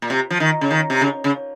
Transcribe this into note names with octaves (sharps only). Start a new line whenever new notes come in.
A#2
C3
F3
D#3
C#3
D#3
C3
C#3
C#3